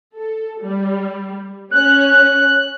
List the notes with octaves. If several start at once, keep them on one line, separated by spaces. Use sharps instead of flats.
A4
G3
C#4 F#6